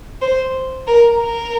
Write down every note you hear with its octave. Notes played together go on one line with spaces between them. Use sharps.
C5
A#4
A#4